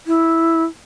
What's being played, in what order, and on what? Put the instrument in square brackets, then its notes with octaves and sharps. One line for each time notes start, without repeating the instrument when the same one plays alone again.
[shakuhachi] E4